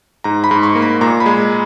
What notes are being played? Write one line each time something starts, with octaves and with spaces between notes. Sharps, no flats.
G#2 A#5
B5
G#2
C#6
A#3
B5
A#2 A#5
B5
G#3